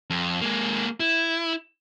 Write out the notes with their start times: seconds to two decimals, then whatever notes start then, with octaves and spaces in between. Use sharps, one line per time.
0.10 F2
0.42 G#3 A#3
1.00 E4